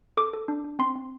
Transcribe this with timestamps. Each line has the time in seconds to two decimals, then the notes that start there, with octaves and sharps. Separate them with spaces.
0.17 A4 D6
0.34 A4
0.48 D4
0.64 D4
0.79 C4 C6
0.95 C4